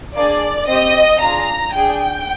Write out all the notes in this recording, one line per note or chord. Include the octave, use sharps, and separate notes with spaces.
A#3 D4 G#4 D5
C4 G4 D#5
D4 F4 G#4 A#5
D4 G#4 G5